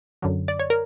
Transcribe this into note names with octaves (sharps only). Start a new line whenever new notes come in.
F#2 D3 F#3
D5
C#5
A#4